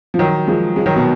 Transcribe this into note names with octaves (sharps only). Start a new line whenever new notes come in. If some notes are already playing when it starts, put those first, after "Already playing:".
F3
D#3 F#3
F3 G#3
F3 G#3
D#3 F#3
B2